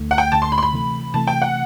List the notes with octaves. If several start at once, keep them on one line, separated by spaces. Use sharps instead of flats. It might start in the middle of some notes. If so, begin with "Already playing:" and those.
Already playing: D2 D3 A3
F#5
G5
D2 D3 A3 A5
C6
B5
C6
B5
C3 E3 A3
C3 E3 A3 A5
G5
F#5